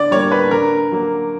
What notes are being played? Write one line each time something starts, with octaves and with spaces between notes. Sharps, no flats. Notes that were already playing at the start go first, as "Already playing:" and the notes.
Already playing: D3 D5
G3 A#3 C#5
B4
D3 A#4
F#3 A#3